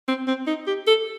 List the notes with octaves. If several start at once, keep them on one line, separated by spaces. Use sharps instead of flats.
C4
C4
D#4
G4
A4